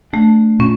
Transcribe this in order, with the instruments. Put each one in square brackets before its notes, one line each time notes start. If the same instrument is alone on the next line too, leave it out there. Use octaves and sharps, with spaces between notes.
[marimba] A3 [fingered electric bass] D4
[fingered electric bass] A#2 [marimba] C#4